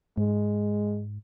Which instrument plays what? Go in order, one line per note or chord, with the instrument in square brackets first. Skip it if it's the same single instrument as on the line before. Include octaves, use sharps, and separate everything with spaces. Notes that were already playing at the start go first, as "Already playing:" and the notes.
[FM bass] G#2 [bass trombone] G#3